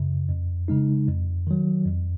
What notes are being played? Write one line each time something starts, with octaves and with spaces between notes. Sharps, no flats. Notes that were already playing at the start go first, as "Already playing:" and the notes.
Already playing: F#2 C#3
F2
C#3 G#3 D#4
F2
D#3 F#3
F2